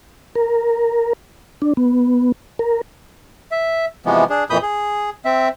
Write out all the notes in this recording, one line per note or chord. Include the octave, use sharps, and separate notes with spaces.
A#4
D4
B3
A#4
E5
C3 E3 F3 G#3 B3
D4 G#4
F2 A#2 E3 B5 D#6 G6
G#4
C4 E5